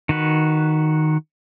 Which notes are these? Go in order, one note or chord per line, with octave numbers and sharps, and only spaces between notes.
D#3 F#4 B4